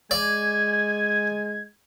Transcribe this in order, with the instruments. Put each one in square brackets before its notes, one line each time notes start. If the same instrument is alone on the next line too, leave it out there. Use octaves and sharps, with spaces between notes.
[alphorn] G#3 [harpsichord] D5 [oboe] G#5 [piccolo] G#6